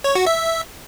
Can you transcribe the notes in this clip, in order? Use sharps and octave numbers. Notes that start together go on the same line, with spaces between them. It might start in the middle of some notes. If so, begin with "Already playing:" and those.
C#5
F#4
E5